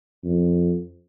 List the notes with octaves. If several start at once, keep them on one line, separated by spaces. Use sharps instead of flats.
F2